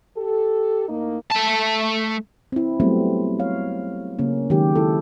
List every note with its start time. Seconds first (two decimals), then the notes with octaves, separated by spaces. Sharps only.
0.17 G4 A4
0.88 A2 A#3 D#4
1.31 A3 A5
2.52 C4 E4
2.80 F#3 G3 A3 B3 C4
3.39 C#5 F5
4.19 C#3 A#3 C#4
4.50 D#3 F#3 G#3 D#4 G4
4.75 E4 A4